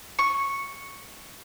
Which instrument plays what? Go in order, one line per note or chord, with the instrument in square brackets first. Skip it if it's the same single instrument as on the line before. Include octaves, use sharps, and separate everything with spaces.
[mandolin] C#6